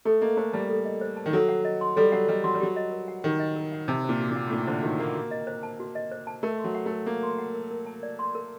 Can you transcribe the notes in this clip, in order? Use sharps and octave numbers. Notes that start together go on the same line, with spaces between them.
A3 A4
A#3 D#5
A3 C5
G3 A5
A4
D#5
C5
A5
D#3
F#3 A4
F#5
D#5
C6
G3 A4
F#3 F#5
G3 D#5
F#3 C6
G3
F#3 G4
D#5
A#4
F#5
D#3 G4
D#5
A#4
F#5
C3 D#4
A#2 C5
F#4
A#2
F#5
A2
A#2 D#4
D3 C5
D#3 F#4
A#3 F#5
F#4
D#5
C5
A5
F#4
D#5
C5
A5
A3 A#4
C6
F#3
F#5
A3
A#4
A#3 A#4
C6
F#5
A#4
A#4
A5
D5
C6
A#4